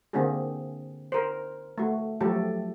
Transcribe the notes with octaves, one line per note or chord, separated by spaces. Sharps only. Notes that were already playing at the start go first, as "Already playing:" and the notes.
D3 A#3 C4 D4 F#4 G#4
A#4 C5
A3 F#4
F3 F#3 A3 G4 A4